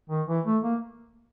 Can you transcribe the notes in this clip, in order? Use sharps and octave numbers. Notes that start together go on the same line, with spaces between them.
D#3
E3
A3
A#3